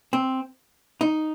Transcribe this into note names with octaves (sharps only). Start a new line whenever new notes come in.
C4
D#4